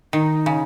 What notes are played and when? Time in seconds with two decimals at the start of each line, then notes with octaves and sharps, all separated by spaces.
0.13 D#3 D#4
0.46 C#3